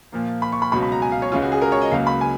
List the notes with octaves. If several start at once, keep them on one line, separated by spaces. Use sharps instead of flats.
A#2 F3 A#3
B5
C#6
B5
C#2 B2 F#3 B5
B5
A#5
G#5
F5
C#5
C#2 C#3 G#3 C#4 F4
F#4
G#4
A#4
C#5
D#5
C#2 C#3 F#3 A#3 F5
B5
G#5